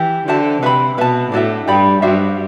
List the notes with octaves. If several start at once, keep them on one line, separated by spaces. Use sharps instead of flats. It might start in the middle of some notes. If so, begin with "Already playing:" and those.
Already playing: E3 G4
D3 F#4 C5 E5 A5
C3 B4 E5 B5
B2 B4 E5 A5
A2 D4 F#4 A4 E5
G2 G4 D5 G5 B5
G2 D4 F#4 C5 E5